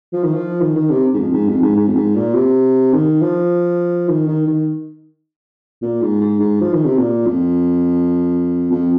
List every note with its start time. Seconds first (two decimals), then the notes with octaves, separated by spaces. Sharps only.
0.13 F3
0.24 D#3
0.34 F3
0.61 D#3
0.76 D#3
0.90 C3
1.14 G#2
1.19 F2
1.33 G#2
1.48 F2
1.62 G#2
1.76 G#2
1.88 F2
1.96 G#2
2.15 A#2
2.34 C3
2.93 D#3
3.22 F3
4.08 D#3
4.28 D#3
4.47 D#3
5.82 A#2
6.01 G#2
6.21 G#2
6.40 G#2
6.61 F3
6.73 D#3
6.85 C3
6.98 A#2
7.27 F2
8.72 F2